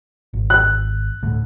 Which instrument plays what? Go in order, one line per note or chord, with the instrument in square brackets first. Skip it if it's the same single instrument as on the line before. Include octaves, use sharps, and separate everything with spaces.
[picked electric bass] G#1
[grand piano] F#6
[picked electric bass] D2 A2